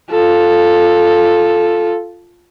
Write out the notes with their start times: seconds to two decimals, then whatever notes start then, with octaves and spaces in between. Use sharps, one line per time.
0.11 F4 A4